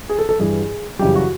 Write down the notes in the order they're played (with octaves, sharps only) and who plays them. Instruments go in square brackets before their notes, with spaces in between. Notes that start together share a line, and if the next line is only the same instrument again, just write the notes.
[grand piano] G#4
A4
A4
G2 E3 G3 G#4
F#2 C#3 E3 G3 G4
F#4